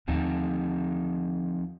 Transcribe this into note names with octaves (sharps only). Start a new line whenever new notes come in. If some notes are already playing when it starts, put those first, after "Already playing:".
D#2 D3 F3 C4 D#4